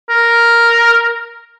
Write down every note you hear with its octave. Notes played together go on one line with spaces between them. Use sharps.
A#4